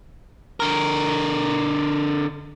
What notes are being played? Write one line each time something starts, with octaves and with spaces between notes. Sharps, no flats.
D3 A#4